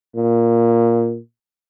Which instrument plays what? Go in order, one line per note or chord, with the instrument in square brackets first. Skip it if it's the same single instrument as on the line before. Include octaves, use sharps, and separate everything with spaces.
[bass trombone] A#2